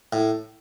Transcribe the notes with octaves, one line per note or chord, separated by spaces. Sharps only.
A2